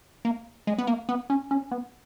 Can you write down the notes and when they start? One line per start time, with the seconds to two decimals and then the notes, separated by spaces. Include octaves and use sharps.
0.25 A#3
0.67 G#3
0.78 B3
0.87 A#3
1.09 B3
1.30 C#4
1.51 C#4
1.71 B3